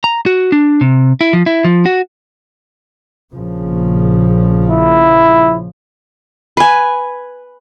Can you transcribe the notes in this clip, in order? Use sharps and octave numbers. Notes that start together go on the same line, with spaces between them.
A#5
F#4
D4
C3
E4
F3
E4
F3
F#4
A#1 C#3 F3
E4
B4 G#5